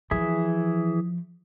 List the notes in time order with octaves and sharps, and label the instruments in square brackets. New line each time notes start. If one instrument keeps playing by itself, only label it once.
[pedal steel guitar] E3 G#4 E5 [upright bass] F3